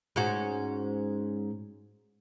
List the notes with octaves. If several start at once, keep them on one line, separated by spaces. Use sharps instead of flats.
G#2 C#4 F#4